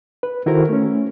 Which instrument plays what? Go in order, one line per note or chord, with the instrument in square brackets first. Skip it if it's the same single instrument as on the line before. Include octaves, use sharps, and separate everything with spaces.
[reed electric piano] B4
D#3 E4 F#4 A4 A#4 C5
A3 C#4